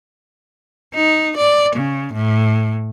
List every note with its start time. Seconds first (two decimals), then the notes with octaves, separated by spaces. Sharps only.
0.94 D#4
1.37 D5
1.76 C#3
2.13 A2